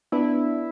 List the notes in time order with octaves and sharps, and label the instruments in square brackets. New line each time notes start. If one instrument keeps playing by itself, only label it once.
[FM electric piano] B3 D4 [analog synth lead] E4